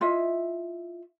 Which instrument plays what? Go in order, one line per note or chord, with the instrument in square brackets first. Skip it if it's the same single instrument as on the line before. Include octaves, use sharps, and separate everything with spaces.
[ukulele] E4 F4 D#5 E5